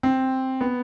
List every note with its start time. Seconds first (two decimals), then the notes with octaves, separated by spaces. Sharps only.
0.03 C4
0.61 B3